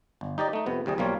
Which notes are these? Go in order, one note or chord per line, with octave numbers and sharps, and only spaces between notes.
G1
D#4 G4 D5 D#5
A3 D#4
F2 C3 B3
D#2 C3 G3 G#4
B1 F3 G3 A#3 F4 C#5